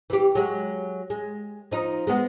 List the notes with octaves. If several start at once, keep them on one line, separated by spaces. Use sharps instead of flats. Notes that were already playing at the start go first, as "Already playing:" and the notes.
E3 G4
F#3 G#3
G#3
F3 D#4
G#3 B3